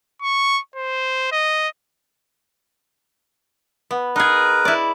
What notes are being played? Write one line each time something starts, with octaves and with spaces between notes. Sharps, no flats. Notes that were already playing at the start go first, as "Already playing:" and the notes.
C#6
C5
D#5
B3
D#4 G#4 A#4 B4
E4 D5